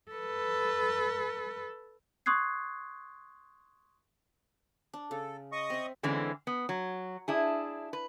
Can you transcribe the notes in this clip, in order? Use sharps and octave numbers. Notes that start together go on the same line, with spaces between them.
A4 B4
C6 C#6 D#6 F#6 G#6 C7
D4
C#3 A4
D#5 C#6 D#6
C4 E5
D3 E3 G#3 C4 C#4
B3
F#3
D4 E4 G#4
B4